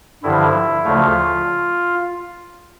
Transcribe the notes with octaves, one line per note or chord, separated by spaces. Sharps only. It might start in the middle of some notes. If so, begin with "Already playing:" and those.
G2 D3 F3 E4
D2 C#3 F3 A3 F4